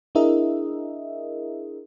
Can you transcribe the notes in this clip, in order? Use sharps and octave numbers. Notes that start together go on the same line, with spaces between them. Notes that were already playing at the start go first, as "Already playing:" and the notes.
D4 E4 G#4 A#4 D#5 E5